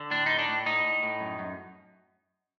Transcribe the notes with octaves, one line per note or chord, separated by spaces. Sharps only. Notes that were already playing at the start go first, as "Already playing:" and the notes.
Already playing: D3
A2 D4
A2 D#4
D4
A2
A2 D#4
A2
A2
F#2
F#2